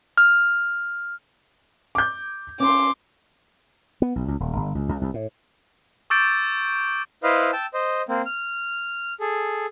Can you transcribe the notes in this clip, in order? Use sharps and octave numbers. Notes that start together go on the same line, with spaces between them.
F6
D6 G6
C#4 C6 D6
B3
B1
C#2
D#1
G1
C#2
C#2
C2
A2
C#6 D6 E6 G6 A6 D7
E4 B4 C5 D#5 F5
G5 A5 E6
C5 D#5
A#3 C4
F6
G#4 A4